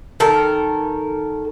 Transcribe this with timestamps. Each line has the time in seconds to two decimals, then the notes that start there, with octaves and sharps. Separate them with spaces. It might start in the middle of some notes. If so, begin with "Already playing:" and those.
0.20 D#3 A4 A#4